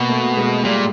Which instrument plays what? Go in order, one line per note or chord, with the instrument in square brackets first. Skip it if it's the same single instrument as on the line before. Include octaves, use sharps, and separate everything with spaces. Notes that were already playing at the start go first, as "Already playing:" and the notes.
Already playing: [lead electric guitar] B2 [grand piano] A#3
[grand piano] A3
G#3
[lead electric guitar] A#2 [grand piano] G3